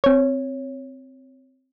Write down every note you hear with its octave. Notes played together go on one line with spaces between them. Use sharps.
C4 C#5